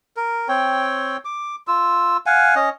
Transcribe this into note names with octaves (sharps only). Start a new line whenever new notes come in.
A#4
C4 C#5 G5
D6
F4 E6
F5 F#5 G#5
C#4 D#5